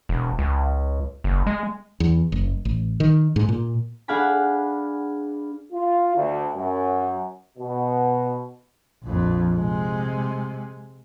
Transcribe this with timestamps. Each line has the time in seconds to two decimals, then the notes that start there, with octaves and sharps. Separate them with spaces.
0.09 E1
0.39 C#2
1.24 F#1
1.47 G#3
2.00 E2
2.32 F#1
2.65 A1
3.00 D#3
3.36 G#2
3.49 A#2
4.08 D4 G#4 F5 F#5 G#5 B5
5.72 F4
6.16 D2
6.55 F#2
7.57 B2
9.03 A#1 F2
9.54 C3 G#3